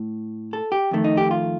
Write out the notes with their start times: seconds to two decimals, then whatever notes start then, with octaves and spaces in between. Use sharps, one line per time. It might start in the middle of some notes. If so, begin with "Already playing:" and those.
Already playing: A2
0.53 A4
0.72 G4
0.91 F2 D#3 A3
1.04 D#4
1.17 G4
1.31 F4